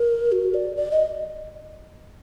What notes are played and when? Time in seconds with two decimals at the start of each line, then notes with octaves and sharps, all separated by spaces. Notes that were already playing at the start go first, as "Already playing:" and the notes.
Already playing: A#4
0.32 F#4
0.54 D5
0.77 D5
0.91 D#5